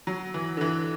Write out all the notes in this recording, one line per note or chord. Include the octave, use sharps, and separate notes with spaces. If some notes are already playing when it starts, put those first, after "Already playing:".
F#3
E3
D3
E3